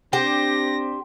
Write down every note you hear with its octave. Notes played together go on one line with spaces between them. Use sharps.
C4 D4 G4 C5 A#6